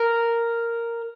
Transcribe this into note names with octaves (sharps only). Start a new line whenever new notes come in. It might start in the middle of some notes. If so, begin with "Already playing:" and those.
Already playing: A#4